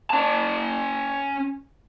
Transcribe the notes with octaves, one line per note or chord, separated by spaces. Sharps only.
C#4 A5